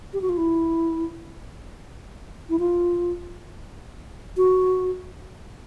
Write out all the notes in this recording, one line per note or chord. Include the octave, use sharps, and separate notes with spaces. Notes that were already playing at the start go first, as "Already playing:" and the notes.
G4
F#4
F4
E4
E4
F4
F#4